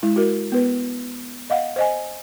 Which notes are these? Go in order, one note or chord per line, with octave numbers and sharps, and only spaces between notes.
G#3 E4
F#4 A#4
B3 B4
D#5 F5 F#5
C5 D#5 G#5